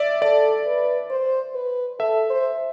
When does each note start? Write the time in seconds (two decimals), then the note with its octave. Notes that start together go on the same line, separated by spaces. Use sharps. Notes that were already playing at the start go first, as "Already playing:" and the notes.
Already playing: D5 E5
0.22 A4 D5
0.66 B4
1.10 C5
1.55 B4
2.00 A4 E5
2.30 C5